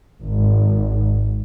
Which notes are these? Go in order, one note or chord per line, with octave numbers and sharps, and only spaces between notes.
G#1